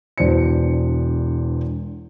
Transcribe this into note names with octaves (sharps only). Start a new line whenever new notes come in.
E1 E2 D4 C5 C#7